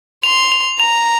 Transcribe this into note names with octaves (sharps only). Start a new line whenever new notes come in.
C6 F7
F7
A#5 F7